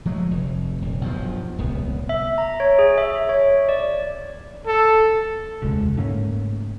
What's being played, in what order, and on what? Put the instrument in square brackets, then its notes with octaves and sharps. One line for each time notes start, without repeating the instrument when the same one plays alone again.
[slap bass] F3 F#3 G#3 A3
F1
D#1
B1 G2 F3
D1 C2 B3
[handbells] E5
A#5
C#5
G#4
E5
C#5
D5
[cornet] A4
[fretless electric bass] E1 D2 C#3 G#3
G#2 A3 A#3 C#4